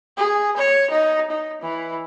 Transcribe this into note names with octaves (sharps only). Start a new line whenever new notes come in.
G#4
C#5
D#4
D#4
E3